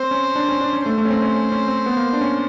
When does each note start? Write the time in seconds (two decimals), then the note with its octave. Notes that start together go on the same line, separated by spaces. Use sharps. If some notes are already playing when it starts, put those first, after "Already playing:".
Already playing: C4 C5
0.11 C#4
0.36 D4
0.48 C#4
0.61 D4
0.73 C#4
0.85 A3 C5
0.98 A3
1.05 C#4
1.10 C4
1.22 C#4
1.36 C#4
1.52 C#4
1.68 C4
1.86 B3
1.97 A#3
2.13 D4
2.21 C#4